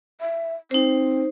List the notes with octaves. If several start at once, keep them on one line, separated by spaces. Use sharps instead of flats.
E5
C4 D#4 C5